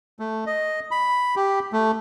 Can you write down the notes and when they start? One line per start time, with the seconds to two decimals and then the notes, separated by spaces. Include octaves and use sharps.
0.20 A3
0.46 D#5
0.91 B5
1.36 G4
1.73 A3